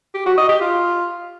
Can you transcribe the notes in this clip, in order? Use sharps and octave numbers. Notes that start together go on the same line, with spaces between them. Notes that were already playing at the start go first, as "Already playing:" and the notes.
G4
F#4
D#5
G4
F4